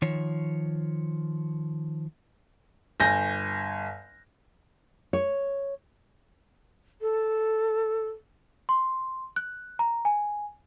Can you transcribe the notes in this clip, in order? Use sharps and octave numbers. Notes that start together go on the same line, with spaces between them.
D#3 F3 C#5
G1 G#5 G6 A#6
C#5
A4
C6
F#6
A#5
G#5